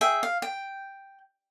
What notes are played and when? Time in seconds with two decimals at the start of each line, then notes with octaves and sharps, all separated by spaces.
0.01 G#4 E5 G5
0.23 F5
0.42 G5